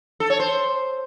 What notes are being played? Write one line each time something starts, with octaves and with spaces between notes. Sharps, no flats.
A4
C#5
C5